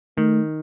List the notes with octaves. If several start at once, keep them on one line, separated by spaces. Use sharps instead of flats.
D#3 A3